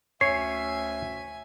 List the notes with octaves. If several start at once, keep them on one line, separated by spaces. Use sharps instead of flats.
D2 C#4 C#5 E5 G#5 C7